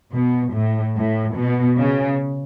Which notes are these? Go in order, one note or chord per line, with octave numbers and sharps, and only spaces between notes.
B2
A2
A2
B2
C#3